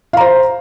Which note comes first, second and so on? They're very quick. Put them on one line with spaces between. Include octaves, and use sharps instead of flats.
F5 A#5 C5